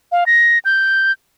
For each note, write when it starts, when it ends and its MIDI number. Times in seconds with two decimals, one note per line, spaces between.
0.12 0.24 77
0.26 0.59 94
0.65 1.12 91